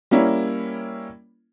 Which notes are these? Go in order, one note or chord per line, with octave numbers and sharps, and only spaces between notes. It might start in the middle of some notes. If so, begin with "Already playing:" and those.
G3 A#3 C#4 E4